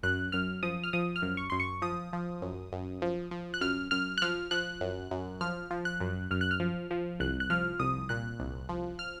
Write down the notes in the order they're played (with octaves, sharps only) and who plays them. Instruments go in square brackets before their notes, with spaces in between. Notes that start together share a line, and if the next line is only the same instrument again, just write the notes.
[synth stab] F#2 F#6
F#2 F6
F3 D#6
F6
F3 D#6
F6
F#2
C#6
F#2 C6
C#6
F3 D#6
F3
F#2
F#2
F3
F3
F#6
F#2 F6
F#2 F6
F#6
F3 F6
F3 F#6
F#2
F#2
F3 F6
F3
F#6
F#2
F#2 F6
F#6
F6
F3
F3
C2 F#6
F#6
F3 F6
C2 D#6
A#2 F#6
C2
F3
F6